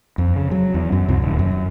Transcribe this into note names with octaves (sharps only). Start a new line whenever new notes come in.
F2
C#3
F#3
E2
F#2
C2
D#1
F#2